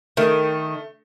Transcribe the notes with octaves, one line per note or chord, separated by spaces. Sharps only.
D#3 A3